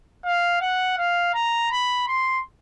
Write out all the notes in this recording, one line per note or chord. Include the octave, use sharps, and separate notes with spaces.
F5
F#5
F5
A#5
B5
C6